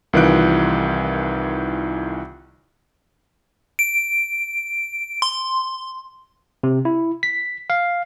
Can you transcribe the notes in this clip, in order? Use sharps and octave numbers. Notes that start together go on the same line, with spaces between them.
C2 D#3 E3 F4 F#6 D7
D7
C6
C3
E4
B6
F5